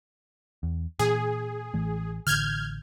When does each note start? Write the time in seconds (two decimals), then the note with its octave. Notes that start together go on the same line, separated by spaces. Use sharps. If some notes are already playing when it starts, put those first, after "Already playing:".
0.63 E2
0.99 A#2 E3 G#4
1.74 A1 E3 A3
2.27 A1 D3 F6 G6 G#6